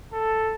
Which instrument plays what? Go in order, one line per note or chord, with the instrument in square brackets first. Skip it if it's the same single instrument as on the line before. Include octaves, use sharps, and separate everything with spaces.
[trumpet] A4